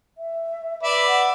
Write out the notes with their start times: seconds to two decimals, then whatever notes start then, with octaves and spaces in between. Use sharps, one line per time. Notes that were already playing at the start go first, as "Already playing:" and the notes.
0.18 E5
0.83 B4 D5 E5
1.07 F#5